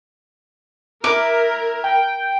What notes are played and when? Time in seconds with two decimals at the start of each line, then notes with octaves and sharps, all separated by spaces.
1.04 E4 A#4 D6
1.84 G5